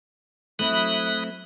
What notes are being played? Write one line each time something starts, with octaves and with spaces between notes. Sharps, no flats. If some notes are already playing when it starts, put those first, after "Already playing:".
F#3 A3 C4 E4 B5 D#6 F#6